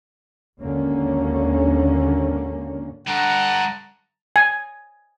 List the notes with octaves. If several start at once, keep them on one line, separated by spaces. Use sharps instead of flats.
G#1 D#2 D3 A#3 C#4
G2 D3 F#5 A5 A#5
G#5